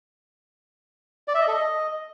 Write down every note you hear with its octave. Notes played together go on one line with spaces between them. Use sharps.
D5
E5
D#5
A4
D#5